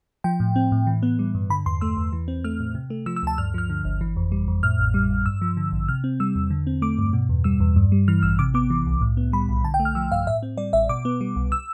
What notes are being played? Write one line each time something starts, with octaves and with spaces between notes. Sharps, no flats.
F3 G5
A2
C4
A2
E3
B3
G3
G2
D3 B5
E2 C6
A3 E6
E2
E3
C4
A3 F6
A2
C3
A3
F3 E6
E6
D2 A5
G2 F6
F3 F6
D3
G1
E3
F2
G3
F2
A2 F6
A1
G3
A1
G2 E6
F3
D3
A1
C3 F6
C4
G3 E6
E2
D3
C4
A3 D6
G2
B2
E2
G3 E6
E2
G2
G3
E3 F6
A1 E6
C3 D6
B3 D6
E3
C2
A2
B3
G3 B5
B1
D3 A5
G5
A3
F6
F3 E6
G2 F5
A2 E5
C4
G3 D5
A1 E5
B2 D6
B3
G3
C2
E6